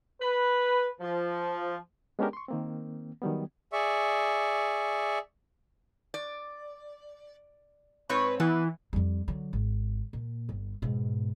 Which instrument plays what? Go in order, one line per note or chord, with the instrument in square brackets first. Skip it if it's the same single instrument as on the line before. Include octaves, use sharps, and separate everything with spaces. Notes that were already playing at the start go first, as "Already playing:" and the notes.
[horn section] B4
F3
[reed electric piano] G#3 B3 C#4 D4 G4 A#4
C6 C#6
D#3 A#3 C4
D#3 F#3 G3 B3
[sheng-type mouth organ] G#4 D5 E5 C#6
[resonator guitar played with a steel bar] D5
[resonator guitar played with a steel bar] G#2 C4 C#5 [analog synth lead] B4
[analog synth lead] E3 [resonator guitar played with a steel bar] B3
[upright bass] F2 G3
D3 F#3
G#1
A#2
G1
G#2 B2